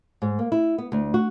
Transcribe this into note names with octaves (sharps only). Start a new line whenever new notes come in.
G#2
A#3
E4
B3
D2
F#4